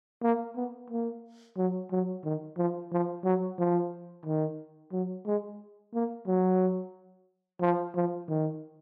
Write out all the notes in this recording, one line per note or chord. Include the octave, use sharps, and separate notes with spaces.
A#3
B3
A#3
F#3
F#3
D#3
F3
F3
F#3
F3
D#3
F#3
G#3
A#3
F#3
F3
F3
D#3